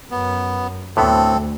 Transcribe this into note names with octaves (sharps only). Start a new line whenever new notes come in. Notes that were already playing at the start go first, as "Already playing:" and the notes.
F#2 B3
D2 A2 D3 B3 C4 A4